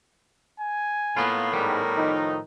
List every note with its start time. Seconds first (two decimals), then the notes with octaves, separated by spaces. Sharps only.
0.60 G#5
1.17 A2 A#3 B3 F4
1.53 G#2 D#3 G3 B3 A#4
1.96 D#3 F3 D#4